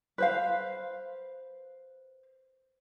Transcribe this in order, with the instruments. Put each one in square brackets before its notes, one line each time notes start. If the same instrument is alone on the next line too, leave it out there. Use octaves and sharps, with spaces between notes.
[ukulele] B4 C5 F5